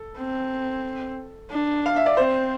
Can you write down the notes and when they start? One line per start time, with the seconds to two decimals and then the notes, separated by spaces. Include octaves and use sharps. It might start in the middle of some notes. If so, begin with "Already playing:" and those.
Already playing: A4
0.17 C4
1.51 D4
1.86 F5
1.96 E5
2.06 D5
2.17 C4 C5